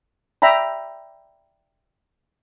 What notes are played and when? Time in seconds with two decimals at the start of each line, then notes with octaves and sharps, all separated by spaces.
0.42 D5 E5 G5 A#5 B5